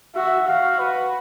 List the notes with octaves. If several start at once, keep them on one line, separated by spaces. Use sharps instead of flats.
F#4 E5
F#4 F5
B4